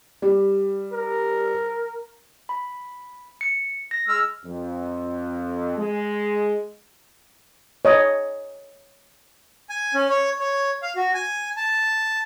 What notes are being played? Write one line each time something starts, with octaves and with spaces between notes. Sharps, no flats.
G3
A#4
B5
C#7
A#6
G#3 E6 F6
F2
G#3
C#5 D#5
G#5
C#4
C#5
C#5
F5
F#4
G#5
A5